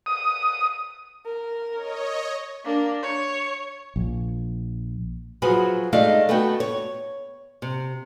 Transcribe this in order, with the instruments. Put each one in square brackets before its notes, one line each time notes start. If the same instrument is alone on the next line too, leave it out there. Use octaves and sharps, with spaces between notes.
[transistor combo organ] D#6
[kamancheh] A#4
[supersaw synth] C#5 D#5
[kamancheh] A#3 D4
C#5
[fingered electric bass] A#1
[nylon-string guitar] F3 F#3 F#4 G#4 B4 C#5
G#3 A3 D#4 D5 F5
A3 B3 F#4 G5
C#5
C3